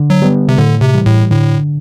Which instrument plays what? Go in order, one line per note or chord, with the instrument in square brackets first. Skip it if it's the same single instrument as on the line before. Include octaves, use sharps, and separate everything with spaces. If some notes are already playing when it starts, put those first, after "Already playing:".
Already playing: [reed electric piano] D3
[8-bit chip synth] F#3
[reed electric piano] G3 B3
[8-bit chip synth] C3
[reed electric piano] A2 [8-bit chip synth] D3
[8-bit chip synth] C3
[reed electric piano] E3 G3
[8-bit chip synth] A2
[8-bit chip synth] A2 [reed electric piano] D3